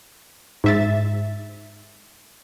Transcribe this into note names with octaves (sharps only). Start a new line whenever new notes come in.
G#2 E5 A6